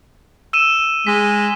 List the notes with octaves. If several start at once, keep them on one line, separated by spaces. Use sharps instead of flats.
E6 D#7 E7
G#3 B6